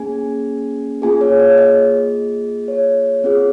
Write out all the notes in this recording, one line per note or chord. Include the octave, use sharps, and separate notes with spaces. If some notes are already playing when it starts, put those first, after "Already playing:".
Already playing: A#3 C#4 G#4 G#5
A#3 F4 G#4 G#5
C#5
C#5
D#5
C#5
C4 F4 G#4